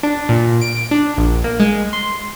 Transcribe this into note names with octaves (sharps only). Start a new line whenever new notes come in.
D4
A#2
D7
D4
A#1
A#3
G#3
C6